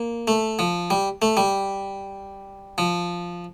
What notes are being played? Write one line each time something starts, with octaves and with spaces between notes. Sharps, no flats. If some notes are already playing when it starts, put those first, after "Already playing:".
Already playing: A#3
A3
F3
G3
A3
G3
F3